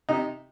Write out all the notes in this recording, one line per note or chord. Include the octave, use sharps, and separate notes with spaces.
C3 D#4